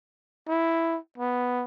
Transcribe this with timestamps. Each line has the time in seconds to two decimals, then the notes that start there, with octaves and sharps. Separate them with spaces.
0.48 E4
1.18 B3